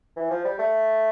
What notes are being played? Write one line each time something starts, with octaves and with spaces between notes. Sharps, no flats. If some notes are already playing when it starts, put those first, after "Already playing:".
E3
F3
G3
A3